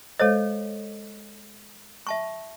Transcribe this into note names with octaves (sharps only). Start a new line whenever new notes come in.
G#3 A4 C5 C#5 D#5
E5 A5 C#6